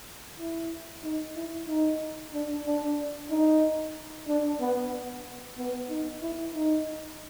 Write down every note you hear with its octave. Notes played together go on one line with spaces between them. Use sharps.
E4
D#4
E4
D#4
D4
D4
D#4
D4
B3
B3
D#4
E4
D#4